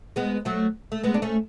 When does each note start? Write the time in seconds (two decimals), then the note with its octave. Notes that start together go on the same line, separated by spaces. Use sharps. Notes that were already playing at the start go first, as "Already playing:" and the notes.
0.16 G#3 B3
0.45 F#3 A3
0.92 A3
1.03 G#3 B3
1.14 D4
1.22 A3 C#4